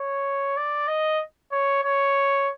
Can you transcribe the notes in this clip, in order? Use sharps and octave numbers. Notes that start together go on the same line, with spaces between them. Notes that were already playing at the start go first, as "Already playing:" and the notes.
Already playing: C#5
D5
D#5
C#5
C#5